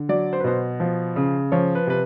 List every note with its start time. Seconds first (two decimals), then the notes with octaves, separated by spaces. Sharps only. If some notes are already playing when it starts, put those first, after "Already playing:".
Already playing: D3
0.09 F#3 D5
0.33 C5
0.40 B4
0.44 B2 C5
0.80 F3
1.16 C#3
1.52 F3 C#5
1.75 B4
1.87 C3 B4